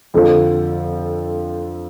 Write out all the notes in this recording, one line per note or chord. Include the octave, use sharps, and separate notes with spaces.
F2 D3 F3